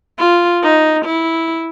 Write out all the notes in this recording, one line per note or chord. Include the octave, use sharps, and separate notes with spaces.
F4
D#4
E4